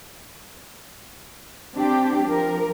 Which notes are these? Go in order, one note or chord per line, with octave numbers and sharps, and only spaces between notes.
C4 D4 G4
F3 A#4